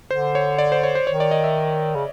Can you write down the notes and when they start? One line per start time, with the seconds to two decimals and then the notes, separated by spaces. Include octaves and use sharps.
0.11 D3 C5
0.35 C#5
0.59 D5
0.72 C5
0.83 C#5
0.95 C5
1.07 D#3 C#5
1.20 D5
1.31 D#5
1.44 E5
1.95 C#3